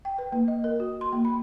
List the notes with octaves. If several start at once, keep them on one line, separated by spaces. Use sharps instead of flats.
G5
B4
A#3
D#5
A#4
F#4
C6
A#3
B5